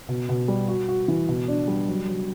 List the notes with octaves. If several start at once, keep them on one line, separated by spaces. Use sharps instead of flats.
B2
B2
G3
F#4
F#4
E3
B2
D4
G3
F#3
F#3